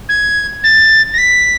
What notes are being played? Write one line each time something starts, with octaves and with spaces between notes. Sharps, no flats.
G#6
A6
A#6
B6